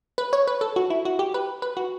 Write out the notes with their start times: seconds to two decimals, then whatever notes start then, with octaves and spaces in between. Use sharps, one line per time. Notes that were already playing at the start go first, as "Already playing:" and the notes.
0.18 B4
0.33 C#5
0.47 B4
0.61 A4
0.76 F#4
0.90 E4
1.05 F#4
1.19 G4
1.34 B4
1.62 B4
1.77 F#4